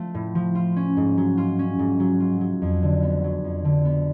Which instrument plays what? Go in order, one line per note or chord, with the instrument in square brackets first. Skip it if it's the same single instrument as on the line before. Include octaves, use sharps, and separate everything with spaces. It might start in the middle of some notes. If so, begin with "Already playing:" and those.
Already playing: [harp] F3 A3 F4
A2
F3
F4
C#4
G#2
F#3
F4
C#4
G#2
F#3
F4
F#3
F2
D3
B3
F#3
F2
D3
B3